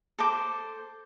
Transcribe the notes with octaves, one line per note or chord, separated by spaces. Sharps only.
A4 C5 D6